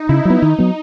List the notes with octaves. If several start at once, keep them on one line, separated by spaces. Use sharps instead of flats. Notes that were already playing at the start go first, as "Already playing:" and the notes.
Already playing: D#4
C#3 E4
F#3 B3
D#3 D#4
F#3 B3